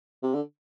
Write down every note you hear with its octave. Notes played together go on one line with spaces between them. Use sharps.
C3
D3